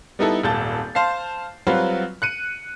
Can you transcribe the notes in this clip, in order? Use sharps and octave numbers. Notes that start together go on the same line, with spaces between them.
G3 B3 D#4 E4 A4
D#1 G#1 A5 G6 A6
C5 F5 A5 C7
F#3 G3 C4 F4 F#4 B4
F#6 C#7 D#7